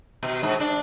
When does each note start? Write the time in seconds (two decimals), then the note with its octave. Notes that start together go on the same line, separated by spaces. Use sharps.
0.23 B2
0.43 G#2
0.60 D4